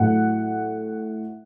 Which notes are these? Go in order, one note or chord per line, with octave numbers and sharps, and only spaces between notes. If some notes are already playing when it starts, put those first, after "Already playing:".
Already playing: A2 F#3 F#5